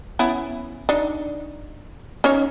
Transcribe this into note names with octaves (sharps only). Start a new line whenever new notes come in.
B3 C#4 E4
D4 D#4
C#4 D#4 C#5